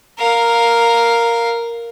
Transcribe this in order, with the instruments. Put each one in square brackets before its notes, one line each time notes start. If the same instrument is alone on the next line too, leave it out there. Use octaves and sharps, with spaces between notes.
[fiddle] A#4 F5